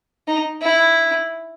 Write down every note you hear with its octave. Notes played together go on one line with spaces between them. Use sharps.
D#4
E4